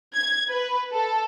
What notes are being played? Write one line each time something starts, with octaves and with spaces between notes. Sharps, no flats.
G#6
B4
A4